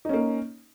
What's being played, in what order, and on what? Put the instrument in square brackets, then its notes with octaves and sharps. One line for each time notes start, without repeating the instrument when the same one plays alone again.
[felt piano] D#4
C#4
A#3